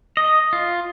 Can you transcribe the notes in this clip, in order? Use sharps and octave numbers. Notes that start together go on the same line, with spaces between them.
D#5
F4